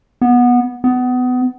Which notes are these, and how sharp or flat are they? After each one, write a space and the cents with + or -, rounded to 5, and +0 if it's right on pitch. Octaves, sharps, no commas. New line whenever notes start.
B3 -15
B3 +25